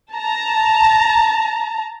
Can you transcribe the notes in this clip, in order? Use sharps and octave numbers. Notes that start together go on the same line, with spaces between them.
A5 A#5